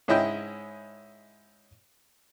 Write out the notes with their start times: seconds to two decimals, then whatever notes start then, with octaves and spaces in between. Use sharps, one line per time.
0.08 G#2 C#4 E4 D#5 G5